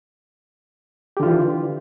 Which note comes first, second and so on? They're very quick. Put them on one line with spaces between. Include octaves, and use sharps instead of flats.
G4 D3 F4 E3